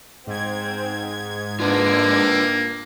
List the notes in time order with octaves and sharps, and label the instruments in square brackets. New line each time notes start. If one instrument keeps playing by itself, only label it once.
[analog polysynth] G#2 G#6 [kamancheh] C4
[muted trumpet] A#3 [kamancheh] D4 [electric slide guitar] F4 B4 A5